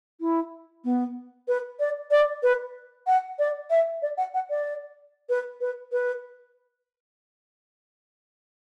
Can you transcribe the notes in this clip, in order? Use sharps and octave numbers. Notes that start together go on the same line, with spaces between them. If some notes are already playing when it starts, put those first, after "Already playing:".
E4
B3
B4
D5
D5
B4
F#5
D5
E5
D5
F#5
F#5
D5
B4
B4
B4